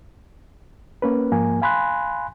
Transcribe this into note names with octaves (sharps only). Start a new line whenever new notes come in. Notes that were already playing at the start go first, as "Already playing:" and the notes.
A#3 C#4 B4
G#2 F3 A#3 G#5
F5 G#5 B5 C6 F#6